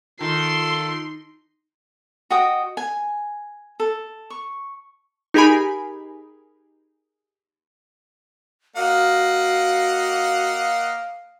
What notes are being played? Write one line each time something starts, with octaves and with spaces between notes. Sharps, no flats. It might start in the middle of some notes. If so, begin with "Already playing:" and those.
D#3 F4 A4 C6
F#4 D#5 G5 D#6
G#5
A4
C#6
D#4 G4 G#4 A#4 G#5 B5
A#3 F#4 D#5 F5 F#5